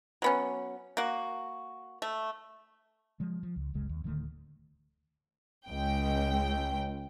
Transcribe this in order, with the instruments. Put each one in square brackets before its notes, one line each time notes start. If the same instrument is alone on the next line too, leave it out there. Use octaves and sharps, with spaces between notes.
[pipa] F#3 B3 C#4
A#3 F#4
A3
[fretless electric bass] F3 G#3
F3
C#2
F#1 C#2 C#3 G#3
D#2
D1 D3 D#3 A3
[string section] C#2 G5